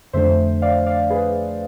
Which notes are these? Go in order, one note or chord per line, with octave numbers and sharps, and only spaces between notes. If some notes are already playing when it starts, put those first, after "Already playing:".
F2 D3 A3 D4 C5 E5
D5 F5
D5 F5
G#4 B4